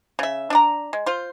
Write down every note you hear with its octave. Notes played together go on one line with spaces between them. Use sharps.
C#3 E5
D4 D5 A#5
G#3
F4 C5